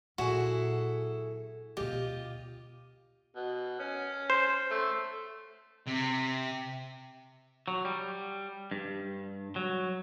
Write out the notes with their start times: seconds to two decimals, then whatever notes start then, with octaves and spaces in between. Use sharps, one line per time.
0.18 A#2 F#3 E4 F#4 G#4 A4
1.77 D2 B2 F4 G4 D#5
3.36 B2
3.79 C#4
4.30 C5
4.71 A3
5.87 C3
7.68 F#3
7.85 G3
8.71 G2
9.56 F#3